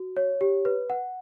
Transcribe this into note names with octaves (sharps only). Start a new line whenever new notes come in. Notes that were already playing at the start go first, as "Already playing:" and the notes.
Already playing: F#4
C#5
G4
B4
F#5